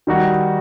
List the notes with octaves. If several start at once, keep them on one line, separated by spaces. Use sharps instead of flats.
D#3 G3 D#4 F#4